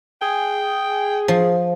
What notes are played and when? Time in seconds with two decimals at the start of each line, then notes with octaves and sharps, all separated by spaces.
0.22 G#4 G5
1.28 F3